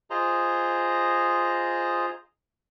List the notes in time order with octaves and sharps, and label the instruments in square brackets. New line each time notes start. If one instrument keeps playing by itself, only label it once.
[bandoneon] F4 G#4 C5 D#5 A#5 C6